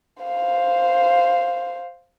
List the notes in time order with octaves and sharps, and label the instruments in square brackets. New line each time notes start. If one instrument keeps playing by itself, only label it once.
[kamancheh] C5 F5